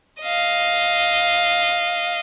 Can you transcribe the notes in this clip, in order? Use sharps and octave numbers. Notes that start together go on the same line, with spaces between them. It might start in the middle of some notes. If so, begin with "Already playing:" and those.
D#5 F5